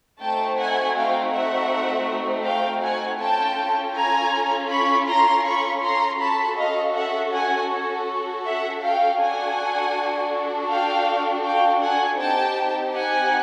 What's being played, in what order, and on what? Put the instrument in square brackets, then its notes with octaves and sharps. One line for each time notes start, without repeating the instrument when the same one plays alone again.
[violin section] A3 C4 D#4 F#4 G5 A5
F#5 G#5
F5 G5
E5 F#5
F5 G5
F#5 G#5
C#4 F4 A4 G5 A5
G#5 A#5
B5 C#6
A#5 C6
B5 C#6
A#5 C6
C#4 F#4 A4 A5 B5
D#5 F5
E5 F#5
F#5 G#5
E5 F#5
F5 G5
D4 F#4 A4 F#5 G#5
F5 G5
F5 G5
F#5 G#5
C4 D#4 G4 G5 A5
F#5 G#5